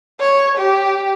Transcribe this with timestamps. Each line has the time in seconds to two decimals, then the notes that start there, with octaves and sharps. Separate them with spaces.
0.20 C#5
0.58 G4